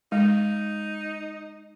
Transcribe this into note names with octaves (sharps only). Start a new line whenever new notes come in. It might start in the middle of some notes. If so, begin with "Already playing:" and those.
G#3 D#4